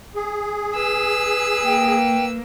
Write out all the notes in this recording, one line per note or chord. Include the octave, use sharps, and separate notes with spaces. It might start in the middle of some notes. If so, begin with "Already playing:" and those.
G#4
B4 E6
A#3 G5